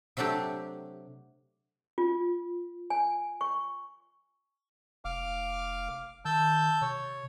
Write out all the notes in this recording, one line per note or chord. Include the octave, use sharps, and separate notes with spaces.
C3 F#3 A3 D4 G4
F4
G#5
C#6
F1 F5 D6 F6
D#3 A5 E6 G6
C3 C#5